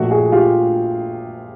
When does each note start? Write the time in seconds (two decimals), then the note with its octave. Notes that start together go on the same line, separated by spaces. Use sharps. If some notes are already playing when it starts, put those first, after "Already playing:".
Already playing: A#1 A#2 F3 A3 F#4
0.11 F#4 G#4
0.32 F4 G4